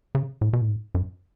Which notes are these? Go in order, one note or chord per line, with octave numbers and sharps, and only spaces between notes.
C#3
A2
B2
A2
G#2
F#2